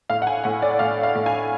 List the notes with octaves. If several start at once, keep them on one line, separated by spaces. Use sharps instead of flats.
A2 F5
F#5
G#5
A2 F#5
D5
A2 F5
F5
A2
G#5